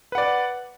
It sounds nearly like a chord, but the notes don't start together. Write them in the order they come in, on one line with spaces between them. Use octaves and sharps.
B4 F#5 D5